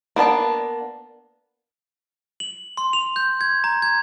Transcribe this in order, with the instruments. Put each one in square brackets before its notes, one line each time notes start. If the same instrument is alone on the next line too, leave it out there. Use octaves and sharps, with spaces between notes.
[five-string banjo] A#3 B3 D4 A5
[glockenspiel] F#7
C6
F7
G6
G#6
A#5
G#6